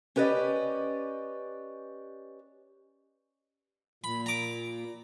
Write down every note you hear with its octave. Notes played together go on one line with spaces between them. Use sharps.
C#4 G4 B4 D5 D#5
A#2 B5
A#5 D6